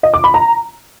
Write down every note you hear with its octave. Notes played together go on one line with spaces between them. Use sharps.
D#5
D6
B5
A#5